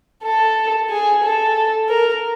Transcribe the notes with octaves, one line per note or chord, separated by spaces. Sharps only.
A4
G#4
A4
A#4